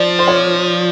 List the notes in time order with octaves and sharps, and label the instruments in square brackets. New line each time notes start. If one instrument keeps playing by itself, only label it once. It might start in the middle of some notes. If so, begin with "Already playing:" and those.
Already playing: [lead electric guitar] F3 [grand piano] D5
[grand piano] C5
C#5